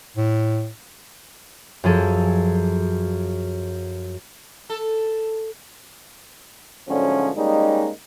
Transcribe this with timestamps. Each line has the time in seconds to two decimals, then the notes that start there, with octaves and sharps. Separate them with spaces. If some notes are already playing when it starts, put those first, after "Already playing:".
0.17 A2
1.84 F#2 F3 G#4 A4
4.70 A4
6.88 D2 G#2 D3 F3 F#3 C#4
7.37 G3 G#3 A#3 C#4 D#4